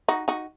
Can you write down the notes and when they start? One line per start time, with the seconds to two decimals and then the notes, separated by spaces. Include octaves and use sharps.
0.08 D#4 F#4
0.28 D#4 F#4